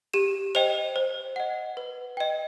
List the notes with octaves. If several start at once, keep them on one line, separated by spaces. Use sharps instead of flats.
G4 E7
C5 D#5 G5 F7
C5
D#5 F#5
B4
D#5 G5